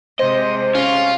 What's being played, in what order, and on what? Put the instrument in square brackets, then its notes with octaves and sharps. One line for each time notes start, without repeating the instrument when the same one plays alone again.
[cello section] C3 G#3 [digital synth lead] C5 [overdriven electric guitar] D#5
[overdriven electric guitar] C#4 [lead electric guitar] F4